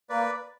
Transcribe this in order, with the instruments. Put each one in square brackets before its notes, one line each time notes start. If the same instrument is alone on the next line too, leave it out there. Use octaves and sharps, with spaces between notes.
[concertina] A#3 B4 D5